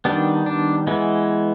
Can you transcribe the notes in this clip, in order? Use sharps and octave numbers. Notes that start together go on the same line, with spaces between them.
D#3 G3 B3 D4
D4
E3 G#3 B3